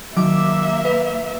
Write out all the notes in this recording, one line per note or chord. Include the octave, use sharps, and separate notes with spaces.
D#3 F#3 A#3 E5 D6
B4